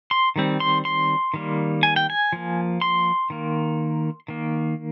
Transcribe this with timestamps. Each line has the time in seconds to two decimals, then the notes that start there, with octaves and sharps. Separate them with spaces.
0.11 C6
0.36 D#3 G3 C4
0.60 C6
0.85 C6
1.34 D#3 G3 A#3
1.83 G#5
1.96 G5
2.10 G#5
2.33 F3 A#3
2.81 C6
3.30 D#3 A#3
4.28 D#3 A#3